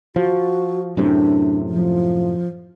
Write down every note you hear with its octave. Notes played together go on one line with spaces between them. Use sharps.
F3 F#4
F#2 A2 C3 D4
F3